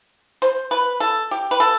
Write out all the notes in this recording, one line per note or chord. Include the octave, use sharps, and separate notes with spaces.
C5
B4
A4
G4
B4
A4